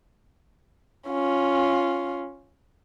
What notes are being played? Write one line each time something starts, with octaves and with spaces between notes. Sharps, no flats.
C#4 F4